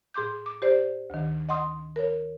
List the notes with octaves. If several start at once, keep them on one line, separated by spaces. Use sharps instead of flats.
A2 G#4 C6 D6 G6
D6
G4 C5 D5
D2 D#3
D#5 F#5 C6 D#6
A#4 C#5